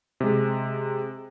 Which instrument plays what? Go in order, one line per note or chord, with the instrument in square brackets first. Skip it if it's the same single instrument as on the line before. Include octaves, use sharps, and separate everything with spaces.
[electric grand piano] C3 G#3